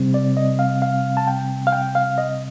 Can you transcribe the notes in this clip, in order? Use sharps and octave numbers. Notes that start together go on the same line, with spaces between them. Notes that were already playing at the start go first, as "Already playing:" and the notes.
Already playing: C3 G3 C4
D5
D#5
F5
F5
A5
G5
F5
G5
F5
D#5